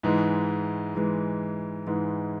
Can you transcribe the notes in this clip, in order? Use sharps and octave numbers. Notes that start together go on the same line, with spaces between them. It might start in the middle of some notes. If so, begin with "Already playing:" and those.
G#2 E3 G#3
G#2 E3 G#3
G#2 E3 G#3